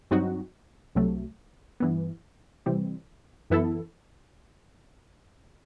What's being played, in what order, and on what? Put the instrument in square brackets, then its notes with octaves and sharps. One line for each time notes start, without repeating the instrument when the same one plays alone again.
[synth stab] G2 F#3 C4 D#4 F#4
C2 C3 F#3 A3
G2 E3 B3
C3 E3 G3 C4
F#2 E3 B3 E4 A4